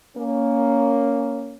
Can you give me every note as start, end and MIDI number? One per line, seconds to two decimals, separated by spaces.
0.17 1.57 58
0.17 1.57 61